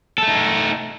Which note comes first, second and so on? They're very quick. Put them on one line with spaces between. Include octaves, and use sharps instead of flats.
A4 A3 D#4